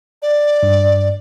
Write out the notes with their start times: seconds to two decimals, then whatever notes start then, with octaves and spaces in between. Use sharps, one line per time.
0.22 D5
0.63 G2